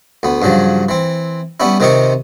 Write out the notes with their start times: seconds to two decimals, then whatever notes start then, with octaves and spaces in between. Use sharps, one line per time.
0.23 D2 B3
0.42 G2 C#3 F3 F#3
0.89 E3 C4
1.60 G3 B3 C#4 E4
1.80 C3 D#3 C4 D#4 F4 C#6